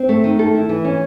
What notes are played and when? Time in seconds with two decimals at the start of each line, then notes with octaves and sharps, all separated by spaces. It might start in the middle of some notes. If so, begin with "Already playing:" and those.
Already playing: C4
0.09 A3
0.24 D#3
0.39 A4
0.54 E4
0.69 E3
0.84 C#4